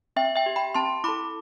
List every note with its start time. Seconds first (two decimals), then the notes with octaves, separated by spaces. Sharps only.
0.16 C4 E5 G5
0.36 E5 G5
0.46 G4
0.56 G5 B5
0.74 C4 A5 C6
1.04 E4 A4 B5 D6